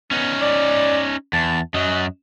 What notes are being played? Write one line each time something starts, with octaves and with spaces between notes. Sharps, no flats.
B3 C#4 D#4
D5
E2 A5
F#2 F#3 D#5